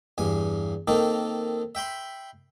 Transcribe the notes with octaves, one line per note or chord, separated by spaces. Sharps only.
E2 G2 G#5
D#3 A#3 C4 D#4 A4
E5 G5 B5 C6